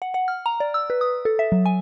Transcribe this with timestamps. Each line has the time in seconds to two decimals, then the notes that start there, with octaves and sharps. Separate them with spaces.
0.02 F#5
0.14 F#5
0.28 F6
0.46 A#5
0.60 D5
0.74 E6
0.90 B4
1.01 D#6
1.25 A4
1.39 E5
1.52 F#3
1.66 G#5